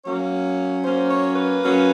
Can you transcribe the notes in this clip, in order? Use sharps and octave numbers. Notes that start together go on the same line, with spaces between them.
F#3 A#3 C#4 C#5
F#3 A#3 C#4 C5
C#5
B4
F#3 A#3 C#4